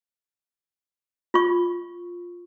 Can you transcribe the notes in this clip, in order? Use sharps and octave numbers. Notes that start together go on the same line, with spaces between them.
F4 C#6